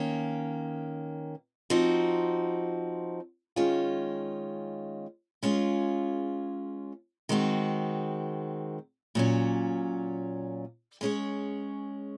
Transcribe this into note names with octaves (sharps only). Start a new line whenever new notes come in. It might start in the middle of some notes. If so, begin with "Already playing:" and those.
Already playing: D#3 A#3 C#4
F3 C4 D#4 F#4
D#3 G#3 C#4 F4
G#3 C#4 F4 G#4
D#3 G#3 C4 F#4
A#2 F#3 C#4
G#3 C#4 G#4 C#5